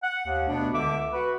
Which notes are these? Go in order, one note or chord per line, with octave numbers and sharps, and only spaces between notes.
F#5
D#2
B2 A3 B3 D4
C#2 D3 E5 D6
F#4 B4